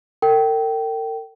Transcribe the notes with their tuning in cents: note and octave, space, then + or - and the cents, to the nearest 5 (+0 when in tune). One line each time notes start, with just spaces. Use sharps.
A#4 -45 G5 -20